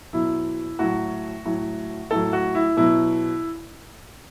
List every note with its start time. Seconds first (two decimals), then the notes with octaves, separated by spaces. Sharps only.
0.13 B2 F#3 E4
0.79 A2 F#3 F#4
1.46 A2 F#3
2.11 A2 F#3 A4
2.33 F#4
2.55 E4
2.77 B2 F#3 E4